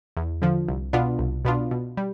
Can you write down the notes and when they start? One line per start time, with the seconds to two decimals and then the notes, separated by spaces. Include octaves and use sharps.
0.17 E2
0.42 D3 F3
0.68 C2
0.93 B2 B3 D4 F4
1.19 C2
1.45 B2 B3 D4 F4
1.71 B2
1.97 G3